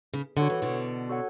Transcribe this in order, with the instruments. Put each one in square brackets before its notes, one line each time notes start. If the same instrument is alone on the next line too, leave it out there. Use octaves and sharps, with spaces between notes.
[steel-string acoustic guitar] C#3
[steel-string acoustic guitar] D3 [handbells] F#4 A4 C#5 F#5
[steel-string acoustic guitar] E3
B2 D3
[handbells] F#4 A4 C#5 F#5